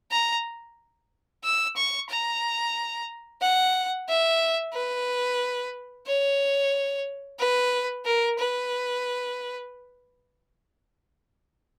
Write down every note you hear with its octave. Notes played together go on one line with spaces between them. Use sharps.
A#5
E6
C#6
A#5
F#5
E5
B4
C#5
B4
A#4
B4